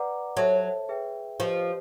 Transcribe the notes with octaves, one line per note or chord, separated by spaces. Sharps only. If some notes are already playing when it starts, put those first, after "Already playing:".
Already playing: B4 D5 F#5 A#5 D6
F#3 A4 C5 E5 A5
G#4 B4 E5 G5
F3 G4 B4 D#5